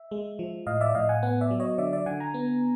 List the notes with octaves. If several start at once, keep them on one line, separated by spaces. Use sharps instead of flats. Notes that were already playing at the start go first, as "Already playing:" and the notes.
Already playing: E5
G#3
F3
A2 D#5 F5
D5 E5
A2 D#5 F5
F#5 G#5
B3 F#5 G#5
D5 E5
F#3
C#5 D#5
D3 D5 E5
D5 E5
D3 F#5 G#5
G#5 A#5
B3